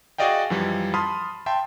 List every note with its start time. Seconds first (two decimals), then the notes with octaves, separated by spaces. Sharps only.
0.18 F#4 G#4 D5 D#5 F5 G5
0.50 F#2 E3 F3 G3
0.94 A5 B5 C6 D#6 F6
1.46 E5 G5 A5 C6